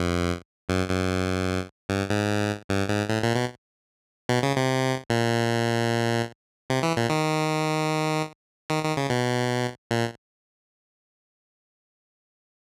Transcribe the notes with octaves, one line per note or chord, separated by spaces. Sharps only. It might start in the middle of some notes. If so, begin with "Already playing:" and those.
Already playing: F2
F#2
F#2
G2
G#2
G2
G#2
A2
A#2
B2
B2
C#3
C3
A#2
C3
E3
A#2
D#3
D#3
D#3
C#3
B2
A#2